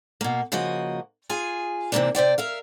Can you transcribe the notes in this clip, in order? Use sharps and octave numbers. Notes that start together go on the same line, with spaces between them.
B2 A#3
C#3 F3 A#3 F#4 D#5
F4 G#4 G#5
C3 E3 G#3 A#3 C4 D4
C3 C5 D5 G5
A#4 E5 F5